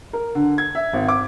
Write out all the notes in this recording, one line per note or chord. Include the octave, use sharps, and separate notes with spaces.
A#4
D3
G#6
E5
G#1
D6